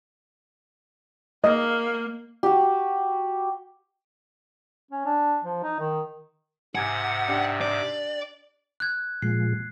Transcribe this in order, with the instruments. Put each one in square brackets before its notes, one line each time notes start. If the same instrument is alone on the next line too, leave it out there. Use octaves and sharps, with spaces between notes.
[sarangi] A#3 [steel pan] D#5
[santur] F#4 G4
[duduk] C#4
D4
F3
D#4
D#3
[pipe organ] G#2 C3 [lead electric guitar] F#5 [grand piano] G#5 G#6 D7
[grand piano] D4 G4 D#5
[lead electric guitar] D5
[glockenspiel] F#6 G#6
[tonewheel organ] A#2 F3 G#3 [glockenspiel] C7